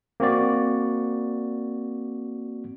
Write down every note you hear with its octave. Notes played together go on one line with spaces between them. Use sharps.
A#3 C4 F#4 D5